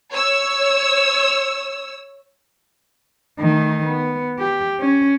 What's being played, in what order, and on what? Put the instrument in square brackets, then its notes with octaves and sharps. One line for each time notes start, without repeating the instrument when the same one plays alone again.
[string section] C#5 E6
[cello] D#3 A3
B3
G4
C#4